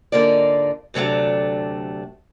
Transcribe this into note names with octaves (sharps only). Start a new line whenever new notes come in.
G#2 D3 A#3 D#4 F4 D5
D2 C3 F#3 A3 D4